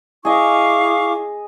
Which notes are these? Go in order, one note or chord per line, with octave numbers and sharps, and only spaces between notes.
E4 G#4 D#5 F5 C#6 D6